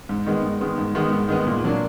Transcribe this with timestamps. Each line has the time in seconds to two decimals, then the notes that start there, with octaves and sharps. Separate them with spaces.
0.09 G#2
0.26 D#3 G#3 B3
0.43 G#2
0.60 D#3 G#3 B3
0.78 G#2
0.95 D#3 G#3 B3
1.12 G#2
1.29 D#3 G#3 B3
1.47 A#2
1.64 F#3 A#3 D4